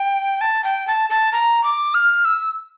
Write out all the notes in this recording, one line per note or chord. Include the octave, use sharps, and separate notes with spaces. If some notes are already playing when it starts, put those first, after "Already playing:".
Already playing: G5
A5
G5
A5
A5
A#5
D6
F6
E6